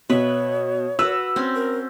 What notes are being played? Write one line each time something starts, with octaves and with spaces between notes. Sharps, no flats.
B2 B4 C#5 E5
F#4 B4 E6
C4 C#4
A#4